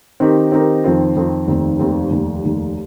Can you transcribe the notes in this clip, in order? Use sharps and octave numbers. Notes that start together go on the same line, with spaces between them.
D#3 C4 D#4 G4 A#4
D#3 C4 D#4 G4 A#4
F2 D#3 C4 F4
F2 D#3 C4 F4
F1 D#2 D#3 C4
F1 D#2 D#3 C4
F1 D#2 D#3
F1 D#2 D#3